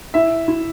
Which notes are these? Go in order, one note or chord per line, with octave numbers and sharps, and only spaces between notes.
E4 E5
E4